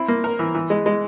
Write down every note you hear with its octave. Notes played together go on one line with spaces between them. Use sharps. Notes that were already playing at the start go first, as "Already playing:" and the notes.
Already playing: C4 E4
A#3
A#4
E3
E3
G#3
G#3